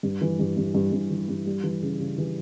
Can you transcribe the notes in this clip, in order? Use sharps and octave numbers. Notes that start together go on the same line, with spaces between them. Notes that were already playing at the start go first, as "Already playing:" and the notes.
G2
E3
G2
G2
G2
G2
E3
G2
G3
E3
C#3
C#3
E3